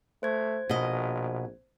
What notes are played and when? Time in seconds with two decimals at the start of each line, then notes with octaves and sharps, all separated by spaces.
0.23 A3 C5 G#6
0.69 A#1 B2 D#5